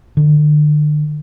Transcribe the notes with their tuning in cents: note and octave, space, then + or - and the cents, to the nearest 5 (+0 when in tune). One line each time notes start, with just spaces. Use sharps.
D3 +35